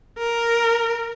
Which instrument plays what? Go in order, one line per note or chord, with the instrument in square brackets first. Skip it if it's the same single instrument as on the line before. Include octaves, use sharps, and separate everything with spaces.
[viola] A#4